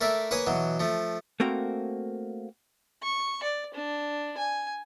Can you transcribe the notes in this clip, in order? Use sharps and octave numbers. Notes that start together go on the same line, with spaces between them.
A3 A#4 D5 E5
A#3 B4 C#5 G#5 D#6
B2 E3 F#3
F3 A3
A3 A#3 C4 F#4 A#4
C#6
D5
D4
G#5